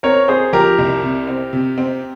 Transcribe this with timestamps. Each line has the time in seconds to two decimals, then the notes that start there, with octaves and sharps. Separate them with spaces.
0.03 C4 A#4 C#5
0.28 C4 G#4 C5
0.53 F3 G4 A#4
0.78 C2
1.03 C3
1.27 C4
1.53 C3
1.78 C4